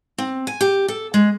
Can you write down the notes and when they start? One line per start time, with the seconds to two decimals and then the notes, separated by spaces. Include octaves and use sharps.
0.18 C4
0.47 G#5
0.61 G4
0.88 A4
1.14 G#3